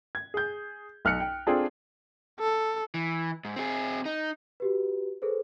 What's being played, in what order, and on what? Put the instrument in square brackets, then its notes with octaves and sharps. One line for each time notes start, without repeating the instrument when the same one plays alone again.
[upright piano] G#6
G#4 G6
B1 F6 F#6 C#7
G5
C4 D4 F4 G#4 A4 A5
[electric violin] A4
[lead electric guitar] E3
G#2
C4 G#4
D#4
[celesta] F#4 G4 B4
G#4 A4 B4 C5